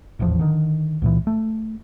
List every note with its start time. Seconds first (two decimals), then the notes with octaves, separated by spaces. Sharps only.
0.19 D#1 A1 E2 F3
0.39 D3 D#3
1.02 C#2 A#2 E3
1.27 A3